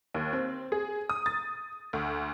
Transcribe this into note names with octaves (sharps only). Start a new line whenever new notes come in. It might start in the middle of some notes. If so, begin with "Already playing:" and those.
D#2
C4
G#4
D#6
A6
D2